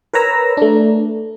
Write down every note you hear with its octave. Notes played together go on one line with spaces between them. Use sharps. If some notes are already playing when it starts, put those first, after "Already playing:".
A#4 B4 C#5 A#5 E6
A3 D4